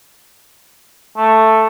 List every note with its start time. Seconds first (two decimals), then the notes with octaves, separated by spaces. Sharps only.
1.17 A3